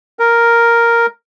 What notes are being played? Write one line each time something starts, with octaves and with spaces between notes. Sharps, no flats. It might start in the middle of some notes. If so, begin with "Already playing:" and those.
A#4